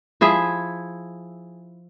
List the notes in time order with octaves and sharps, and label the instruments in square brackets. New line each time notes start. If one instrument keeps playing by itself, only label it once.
[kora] F3 E4 G#4 E5